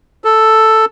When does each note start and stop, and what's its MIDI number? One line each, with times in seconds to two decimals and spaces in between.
0.24 0.85 69